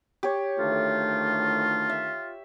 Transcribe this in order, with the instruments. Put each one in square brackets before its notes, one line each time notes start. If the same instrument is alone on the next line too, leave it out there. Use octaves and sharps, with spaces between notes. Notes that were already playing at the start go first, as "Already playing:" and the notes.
[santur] G4 C#5
[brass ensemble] D2 D#3 A3 [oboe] F4
[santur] E5